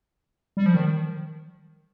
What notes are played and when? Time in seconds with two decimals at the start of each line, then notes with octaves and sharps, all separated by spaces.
0.57 G3
0.66 F3
0.74 D#3